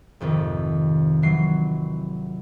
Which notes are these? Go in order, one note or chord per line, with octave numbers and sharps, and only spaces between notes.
G#1 F2 C3 D#3
E3 F#3 C7